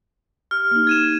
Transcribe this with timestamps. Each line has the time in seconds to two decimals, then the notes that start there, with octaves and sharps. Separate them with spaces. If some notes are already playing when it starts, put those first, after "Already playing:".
0.51 G4 F6
0.71 A#3 D#4
0.87 G#6 D#7 E7